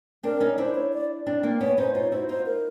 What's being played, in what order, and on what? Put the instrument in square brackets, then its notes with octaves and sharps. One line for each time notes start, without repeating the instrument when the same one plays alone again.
[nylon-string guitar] C4 D4 [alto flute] A#4
[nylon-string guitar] C#4 D#4
[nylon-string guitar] D4 E4 [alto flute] C5
[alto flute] C#5
D5
[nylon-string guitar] C4 D4
A#3 C4
[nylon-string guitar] B3 C#4 [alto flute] C#5
[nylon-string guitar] C#4 D#4 [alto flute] C5
[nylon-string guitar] D#4 F4 [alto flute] C#5
[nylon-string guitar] E4 F#4 [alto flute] C5
[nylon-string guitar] D#4 F4 [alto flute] C5
[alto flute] A#4